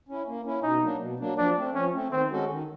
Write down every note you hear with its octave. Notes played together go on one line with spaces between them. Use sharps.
C#4 E4
A#3
C#4 E4
B2 D#4
F#3 A#3 D4
B2
F#3 A#3 D4
F3 D4
A3 C4
F3 C#4
A3 C4
D#3 C4
G#3 C#4 F#4 A4
D#3